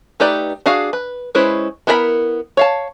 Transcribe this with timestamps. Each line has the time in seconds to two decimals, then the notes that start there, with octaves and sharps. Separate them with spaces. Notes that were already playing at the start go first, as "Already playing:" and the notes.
0.20 A3 D#4 G4 B4 D5
0.66 D4 F#4 G#4 F5
0.93 B4
1.35 G#3 C#4 E4 B4 C5
1.87 B3 E4 A#4 F5 B5
2.57 C#5 F5 A5